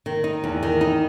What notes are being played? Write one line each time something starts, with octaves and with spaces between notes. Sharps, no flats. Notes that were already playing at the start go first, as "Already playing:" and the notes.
D#3
D#4
E2
D#3
D#4